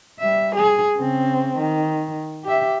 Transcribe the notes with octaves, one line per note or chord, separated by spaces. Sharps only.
G3 E5
G#4
C#3 C4
D#3
G4 E5